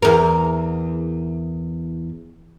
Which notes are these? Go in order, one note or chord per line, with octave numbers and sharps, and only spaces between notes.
E2 A#4